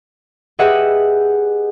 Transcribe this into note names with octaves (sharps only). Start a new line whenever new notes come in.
G4 G#4 B4 D#5 E5 F#5